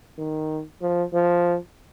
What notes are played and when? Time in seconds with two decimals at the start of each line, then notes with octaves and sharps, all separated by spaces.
0.18 D#3
0.81 F3
1.13 F3